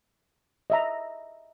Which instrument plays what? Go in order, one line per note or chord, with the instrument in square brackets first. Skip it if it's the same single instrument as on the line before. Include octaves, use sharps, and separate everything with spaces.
[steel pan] D#5 E5 A#5